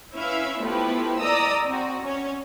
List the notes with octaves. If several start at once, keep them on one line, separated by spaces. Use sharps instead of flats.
C#4 E4 B4 E5 F5
F3 A3 B3 E4 G4 B4
D5 D#5 A#5 D#6 E6
C4 F#4
C#4 C#5